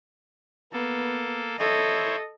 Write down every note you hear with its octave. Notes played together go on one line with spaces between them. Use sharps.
A#3 B3 A4
E4 A4 C5 C#5 D#5